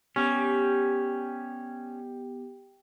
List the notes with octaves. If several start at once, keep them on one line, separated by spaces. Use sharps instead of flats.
G3 B3 C#4 G4